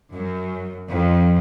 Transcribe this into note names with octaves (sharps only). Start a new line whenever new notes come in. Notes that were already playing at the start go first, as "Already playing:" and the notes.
F#2
F2